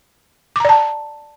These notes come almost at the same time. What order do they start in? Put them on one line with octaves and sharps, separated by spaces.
D6 A#5 D5 A5